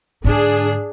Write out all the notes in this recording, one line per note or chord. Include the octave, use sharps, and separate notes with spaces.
G#2 D3 D4 G#4